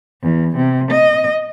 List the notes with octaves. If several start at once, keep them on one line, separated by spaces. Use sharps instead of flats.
E2
C3
D#5